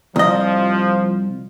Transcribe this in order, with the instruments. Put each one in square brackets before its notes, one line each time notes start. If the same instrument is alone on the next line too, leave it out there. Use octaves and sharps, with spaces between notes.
[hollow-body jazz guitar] C2 D#5 [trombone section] F3